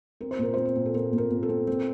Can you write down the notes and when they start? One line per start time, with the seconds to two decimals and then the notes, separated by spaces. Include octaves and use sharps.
0.21 C4 A#4
0.31 C5
0.39 A#2 A#4
0.54 C4 C5
0.65 A#4
0.76 A#2
0.86 A4
0.95 A#2 A#4
1.13 A#2
1.18 A#4
1.31 A#2
1.43 A4
1.49 C4
1.67 C4